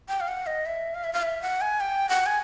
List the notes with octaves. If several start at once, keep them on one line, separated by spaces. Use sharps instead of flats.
G5
F5
F#5
D#5
E5
F5
E5
F5
E5
F#5
G#5
G5
F#5
G#5